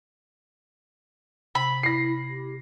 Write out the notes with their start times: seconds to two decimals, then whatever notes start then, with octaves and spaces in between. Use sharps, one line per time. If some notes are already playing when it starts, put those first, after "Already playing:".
1.55 C3 B5
1.83 E4 A#6 C7
2.30 G4